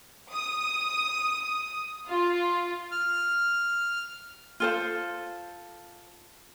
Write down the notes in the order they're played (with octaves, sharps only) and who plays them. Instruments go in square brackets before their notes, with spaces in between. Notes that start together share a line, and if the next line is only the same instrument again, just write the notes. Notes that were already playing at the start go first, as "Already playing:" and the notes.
[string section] D#6
F4
[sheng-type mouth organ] F6
[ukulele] F4 A4 C5